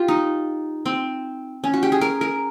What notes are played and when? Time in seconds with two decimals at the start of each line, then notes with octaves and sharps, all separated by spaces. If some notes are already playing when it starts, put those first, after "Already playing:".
Already playing: F4 G4
0.08 D#4
0.86 C4
1.64 C#4
1.74 F#4
1.83 G4
1.92 G#4
2.01 A#4
2.21 A#4